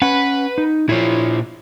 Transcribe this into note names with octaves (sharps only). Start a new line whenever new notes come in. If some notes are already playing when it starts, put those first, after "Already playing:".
C#4 B4 F#5
D#4
A#2 F3 E4 C#5